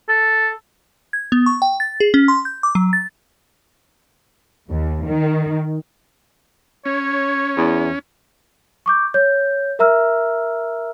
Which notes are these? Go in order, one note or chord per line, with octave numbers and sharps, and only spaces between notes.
A4
G#6
B3
C#6
G5
A6
G#4
C#4
C6
G6
D6
F#3
A6
D#2
D#3
C#4 C#5
E2
C#6 D6 G6
C#5 G6
A#4 E5 A#5 E6 F6